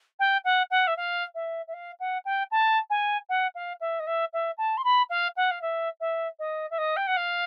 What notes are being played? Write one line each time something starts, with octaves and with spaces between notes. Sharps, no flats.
G5
F#5
F#5
E5
F5
E5
E5
F5
F#5
G5
A5
G#5
F#5
F5
E5
D#5
E5
E5
A5
C6
B5
F5
F#5
F5
E5
E5
D#5
E5
D#5
G5
F#5
F5